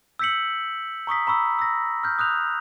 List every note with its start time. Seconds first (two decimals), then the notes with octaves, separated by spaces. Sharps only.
0.19 E6 G6 B6 C#7 F#7
1.07 A#5 C#6 D#6 B6
1.27 A#5 B5 C#6 E6
1.59 E6 A#6
2.04 F6 G6
2.19 D#6 F#6 G6 F7